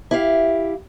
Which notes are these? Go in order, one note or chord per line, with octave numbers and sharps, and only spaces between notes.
E4 G4 F5